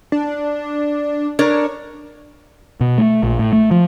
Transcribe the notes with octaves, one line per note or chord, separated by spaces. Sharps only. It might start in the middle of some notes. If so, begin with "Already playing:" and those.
D4
D4 A#4 C#5
B2
A3
A#1
A2
A3
F3